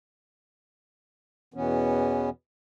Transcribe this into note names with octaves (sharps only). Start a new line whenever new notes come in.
E2 B2 E3 B3 C#4